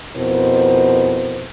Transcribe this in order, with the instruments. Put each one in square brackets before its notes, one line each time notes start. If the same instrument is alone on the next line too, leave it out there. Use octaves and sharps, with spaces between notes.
[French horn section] F2 B2 E4 A#4 C5